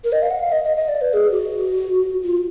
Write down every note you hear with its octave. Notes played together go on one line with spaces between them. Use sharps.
A#4
D#5
F5
F#5
F5
D#5
D#5
D#5
D5
B4
G#4
F#4
F4